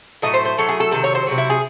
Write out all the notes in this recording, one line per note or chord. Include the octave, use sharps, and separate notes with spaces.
A2 F#3 A3 D#5
C5
C5
A2 F#3 A3 A4
G#4
A4
C3 D#3 F#3 A4
C#5
C5
C3 D#3 F#3
E4
G#4